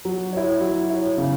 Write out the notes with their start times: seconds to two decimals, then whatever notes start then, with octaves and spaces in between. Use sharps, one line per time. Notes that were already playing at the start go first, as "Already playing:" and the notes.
0.05 F#3
0.33 E4 C#5
0.61 F#3
0.90 E4 C#5
1.18 C#3